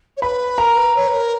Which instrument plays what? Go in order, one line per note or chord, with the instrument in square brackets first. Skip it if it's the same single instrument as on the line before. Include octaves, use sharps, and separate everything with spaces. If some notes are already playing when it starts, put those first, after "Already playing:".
[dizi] C#5
[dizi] B4 [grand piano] B5
[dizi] A#4 [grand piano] A#5
[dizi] B4
C#5
B4
A#4